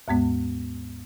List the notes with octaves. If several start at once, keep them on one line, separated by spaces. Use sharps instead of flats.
D#2 G#2 G#3 B3